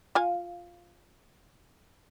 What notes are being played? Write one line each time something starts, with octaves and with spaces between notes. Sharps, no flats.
F4 F5 G#5